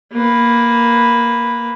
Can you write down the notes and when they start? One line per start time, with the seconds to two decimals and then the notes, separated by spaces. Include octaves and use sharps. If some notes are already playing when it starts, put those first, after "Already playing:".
0.12 A#3 B4